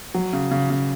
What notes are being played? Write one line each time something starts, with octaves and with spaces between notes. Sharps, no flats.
F#3
C#3
C#3
C#3